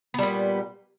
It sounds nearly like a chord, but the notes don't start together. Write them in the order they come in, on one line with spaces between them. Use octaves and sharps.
B3 G3 A#2